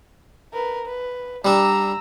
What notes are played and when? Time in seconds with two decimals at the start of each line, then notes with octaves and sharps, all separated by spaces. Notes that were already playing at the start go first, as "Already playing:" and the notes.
0.53 A#4 B4
0.86 B4
1.45 G3 D4 A#5 E6